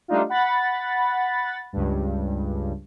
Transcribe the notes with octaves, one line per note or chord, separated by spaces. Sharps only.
G3 A3 D4 D#4 F4
F#5 B5 A6
C#2 G2